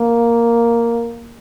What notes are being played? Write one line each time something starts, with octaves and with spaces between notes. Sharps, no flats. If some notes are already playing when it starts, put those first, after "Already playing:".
Already playing: A#3